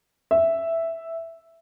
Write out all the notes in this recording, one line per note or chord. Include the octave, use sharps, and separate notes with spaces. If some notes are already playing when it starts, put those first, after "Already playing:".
E5